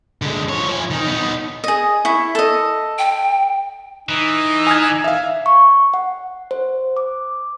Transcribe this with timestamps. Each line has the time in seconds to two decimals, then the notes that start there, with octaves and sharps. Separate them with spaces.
0.22 D3 G#3
0.49 F3 C#5
0.68 F3 G#5
0.91 D#3 D#4
1.07 B3 D#4
1.64 G#4 D#5
2.05 E4 C#6
2.35 A4 D#5
2.98 G5
4.09 E3 D#4
4.67 G#5 F6 G#6
5.04 E5 F5
5.46 C#6
5.94 F#5
6.51 C5
6.97 D6